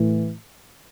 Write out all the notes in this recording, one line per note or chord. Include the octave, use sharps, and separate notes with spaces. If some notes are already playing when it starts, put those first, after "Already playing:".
Already playing: A2 E3